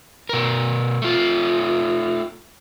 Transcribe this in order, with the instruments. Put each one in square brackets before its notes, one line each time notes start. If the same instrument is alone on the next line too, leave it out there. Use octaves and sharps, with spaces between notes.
[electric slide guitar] B2 A#4
A3 F4